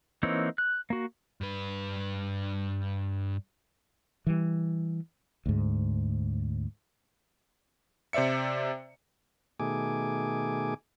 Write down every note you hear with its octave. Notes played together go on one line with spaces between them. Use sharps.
E3 A#3 C4 D#4 C#5
F#6
A#3 F#4
G2 B4
E3 G3
D2 G#2
C3 C5 D5 E5 C#7
B2 D#3 A3 G#4 G#5 D6